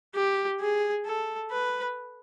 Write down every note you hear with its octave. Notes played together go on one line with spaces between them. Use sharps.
G4
G#4
A4
B4